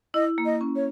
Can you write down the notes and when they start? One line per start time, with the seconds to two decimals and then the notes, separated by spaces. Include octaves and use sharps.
0.14 E4 D#5
0.38 A#3
0.45 D#5
0.61 C#4
0.76 C#5